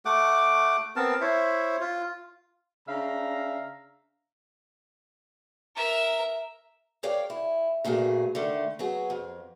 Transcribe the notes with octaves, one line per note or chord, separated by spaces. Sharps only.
A3 F#5 D6
B3 C4 A#4 A5
E4 C5 C#5 E5
F4
C#3 D4 E5 F5 A#5
A#4 E5
G#4 A#4 C#5 D5 F5 G5
E4
G2 A#2 A3 F#4 G#4
D3 D#3 A3
F#3 B3 F#4 G#4
F2